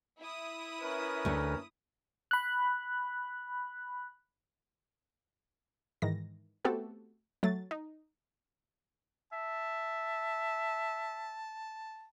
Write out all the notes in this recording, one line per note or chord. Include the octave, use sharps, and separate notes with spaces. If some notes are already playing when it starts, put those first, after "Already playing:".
E4 D#6
C#4 A#4 B4
D2 A3
B5 F#6
G#2 D#3 E3 A#6
A3 B3 C4 F#4 G4 A4
F#3 A3 A6
D#4
E5 A5